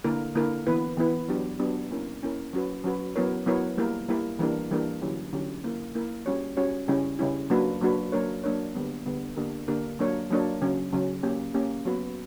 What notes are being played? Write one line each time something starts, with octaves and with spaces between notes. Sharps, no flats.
D3 A#3 E4 A#4
D3 A#3 E4 A#4
E3 B3 E4 B4
E3 B3 E4 B4
F#3 B3 D4 G4
F#3 B3 D4 G4
A#3 C#4 E4 A#4
A#3 C#4 E4 A#4
F#3 C#4 F#4 B4
F#3 C#4 F#4 B4
F#3 B3 E4 A#4 C#5
F#3 B3 E4 A#4 C#5
G3 A#3 E4 A#4
G3 A#3 E4 A#4
E3 G3 A#3 D4 A#4
E3 G3 A#3 D4 A#4
D3 F#3 C#4 E4 G4
D3 F#3 C#4 E4 G4
A#3 E4 A#4
A#3 E4 A#4
G3 C#4 F#4 C#5
G3 C#4 F#4 C#5
C#3 G3 C#4 E4
C#3 G3 C#4 E4
F#3 A#3 D4 F#4 B4
F#3 A#3 D4 F#4 B4
F#3 A#3 D4 A#4 C#5
F#3 A#3 D4 A#4 C#5
D3 G3 B3
D3 G3 B3
D3 A#3 D4 G4 A#4
D3 A#3 D4 G4 A#4
F#3 A#3 D4 A#4 C#5
F#3 A#3 D4 A#4 C#5
C#3 F#3 C#4
C#3 F#3 C#4
A#3 C#4 G4
A#3 C#4 G4
F#3 B3 F#4 B4